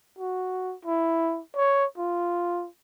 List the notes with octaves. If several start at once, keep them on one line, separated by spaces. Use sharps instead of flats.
F#4
E4
C#5
F4